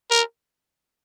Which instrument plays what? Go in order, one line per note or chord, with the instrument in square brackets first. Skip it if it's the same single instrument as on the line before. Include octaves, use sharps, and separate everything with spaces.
[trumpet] A#4